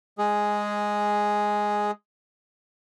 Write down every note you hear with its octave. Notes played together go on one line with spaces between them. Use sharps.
G#3 G#4